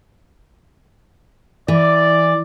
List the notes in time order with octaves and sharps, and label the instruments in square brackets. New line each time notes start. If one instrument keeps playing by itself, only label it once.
[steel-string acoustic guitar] E3 [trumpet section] D5